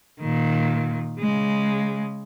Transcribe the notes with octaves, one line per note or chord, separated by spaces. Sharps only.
A#2 D#3
C#3 G#3